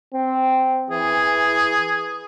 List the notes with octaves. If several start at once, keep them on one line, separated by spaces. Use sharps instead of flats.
C4
E3 G#4